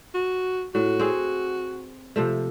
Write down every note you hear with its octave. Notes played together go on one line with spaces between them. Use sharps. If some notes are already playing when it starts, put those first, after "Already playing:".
F#4
A2 F#4
C4 G#4 F#5
C3 F3 A3